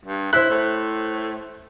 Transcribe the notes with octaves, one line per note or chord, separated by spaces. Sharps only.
G2
E4 C5 F#6
A2